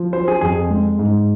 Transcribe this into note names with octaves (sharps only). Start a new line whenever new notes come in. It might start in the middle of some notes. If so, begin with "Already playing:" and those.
Already playing: F3
F#3 C5
G#4
F2 G#4
G#3
G#2